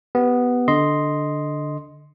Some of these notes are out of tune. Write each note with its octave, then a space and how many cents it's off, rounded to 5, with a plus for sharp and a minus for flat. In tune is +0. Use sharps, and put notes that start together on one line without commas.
B3 +0 G4 -10
D3 +0 D#5 +0 C6 +0